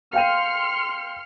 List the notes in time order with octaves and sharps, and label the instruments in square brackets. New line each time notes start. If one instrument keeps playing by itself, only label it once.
[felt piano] F5 G5 D#7 [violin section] C6 F6 C#7